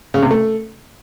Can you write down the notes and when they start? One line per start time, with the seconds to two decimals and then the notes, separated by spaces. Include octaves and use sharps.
0.14 C#3
0.22 C3
0.31 A3